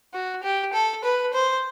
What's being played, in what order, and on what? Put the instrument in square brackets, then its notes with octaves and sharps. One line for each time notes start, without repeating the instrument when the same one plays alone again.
[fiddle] F#4
G4
A4
B4
C5